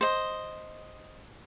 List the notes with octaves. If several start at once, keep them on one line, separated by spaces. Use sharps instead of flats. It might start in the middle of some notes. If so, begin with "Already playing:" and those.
C5 D#5